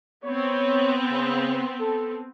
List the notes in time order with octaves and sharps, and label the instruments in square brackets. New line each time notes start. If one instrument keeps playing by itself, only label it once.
[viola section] B3 C4 [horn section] C#5
[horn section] C#3
A4